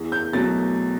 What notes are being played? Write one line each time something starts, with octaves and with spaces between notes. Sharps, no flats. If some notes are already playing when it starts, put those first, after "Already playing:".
Already playing: E2
G6
B2 F#3 A3 A6